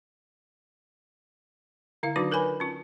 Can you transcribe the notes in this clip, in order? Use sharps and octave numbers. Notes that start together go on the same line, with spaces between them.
D3 E4 F5
D#3 F#3 D4 D#4 F#4 D6
A#4 B4 C#5 G#5 B5
C#4 F4